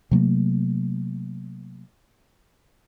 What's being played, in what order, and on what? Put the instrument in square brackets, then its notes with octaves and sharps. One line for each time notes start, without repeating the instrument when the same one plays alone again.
[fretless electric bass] C3 F#3 A3 A#3